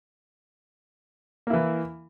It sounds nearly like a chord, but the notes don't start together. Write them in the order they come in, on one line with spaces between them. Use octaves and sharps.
A#3 E4 E3